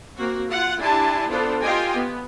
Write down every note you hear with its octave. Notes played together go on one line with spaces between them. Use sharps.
A#3 C4 F#4
F4 F#5
D4 E4 G4 G#5 A5 C6
B3 D4 F4 A4 C5
F4 G4 D#5 G5 G#5
B3